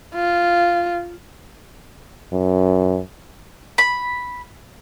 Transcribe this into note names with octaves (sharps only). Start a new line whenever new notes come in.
F4
F#2
B5